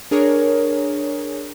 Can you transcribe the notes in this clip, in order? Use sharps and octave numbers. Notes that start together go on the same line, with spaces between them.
D4 G#4 A#4 C#5